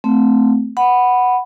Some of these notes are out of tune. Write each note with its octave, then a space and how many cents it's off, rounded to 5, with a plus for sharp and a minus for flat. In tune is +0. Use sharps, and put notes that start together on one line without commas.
A3 +0 C4 -15
F#5 +0 B5 +0